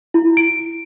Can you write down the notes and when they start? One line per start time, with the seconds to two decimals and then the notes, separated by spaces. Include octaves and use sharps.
0.14 E4
0.37 D7